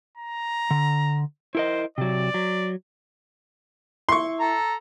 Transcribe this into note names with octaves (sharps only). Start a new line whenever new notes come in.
A#5
D3
E4 A#4 C5 D#5
C3 F#3 D5
F#3
E4 C6 C#6
A4 A#5